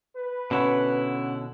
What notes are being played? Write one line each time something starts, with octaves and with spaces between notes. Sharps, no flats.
B4
B2 D3 C#4 E4 C#5 F#5